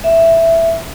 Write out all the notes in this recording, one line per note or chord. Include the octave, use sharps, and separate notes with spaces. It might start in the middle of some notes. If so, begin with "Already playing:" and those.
E5